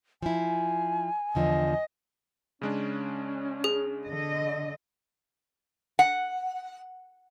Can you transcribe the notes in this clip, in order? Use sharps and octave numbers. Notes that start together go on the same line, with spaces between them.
F3 E4 G#5
E2 D3 F3 D#5
C#3 G#3 C#4 D4
G#4
D3 D#5
F#5